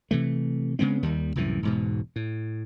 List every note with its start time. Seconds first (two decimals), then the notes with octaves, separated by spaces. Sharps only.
0.11 C3 E3 A3
0.79 C#3 G#3 B3 C4
1.03 D#2 D#3 G3
1.36 C2 F#2 A2 E3
1.63 E1 G#2 B2
2.16 A2